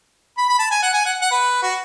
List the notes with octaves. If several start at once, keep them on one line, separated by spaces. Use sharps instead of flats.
B5
B5
A5
G#5
F#5
G#5
F#5
F#5
B4
F#4